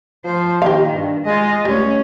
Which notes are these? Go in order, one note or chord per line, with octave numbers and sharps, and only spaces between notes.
F3 C5
A#2 D#3 G4 F5
G2
G#3 F4 D#5
C#2 A2 G3 C#4